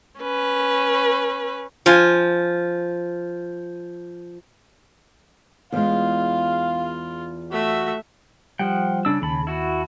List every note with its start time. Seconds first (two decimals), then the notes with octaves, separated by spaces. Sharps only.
0.20 C#4 B4
1.86 F3 F4 G#5
5.72 E2 G#3 F4 F5
7.51 A3 F#4 E5
8.59 F3 G3 F#5 G5
9.05 C#3 D4 E6
9.22 D#2 C#3 A5 B5
9.47 E4 F#4